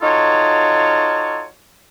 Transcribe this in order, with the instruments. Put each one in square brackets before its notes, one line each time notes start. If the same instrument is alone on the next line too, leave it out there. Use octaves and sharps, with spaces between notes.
[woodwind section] D#4 F4 F#4 A4 C#5